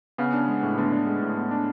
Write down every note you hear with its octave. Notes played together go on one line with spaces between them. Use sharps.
C#3 B3
D4
G#3
A2
D3 B3
D4
G#3
A2
B3
D4